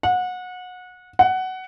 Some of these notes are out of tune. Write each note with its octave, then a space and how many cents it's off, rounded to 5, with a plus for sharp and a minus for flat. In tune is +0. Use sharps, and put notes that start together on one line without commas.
F#5 -25
F#5 +15